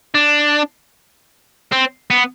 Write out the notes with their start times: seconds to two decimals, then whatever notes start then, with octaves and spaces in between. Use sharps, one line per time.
0.15 D4
1.72 C4
2.10 B3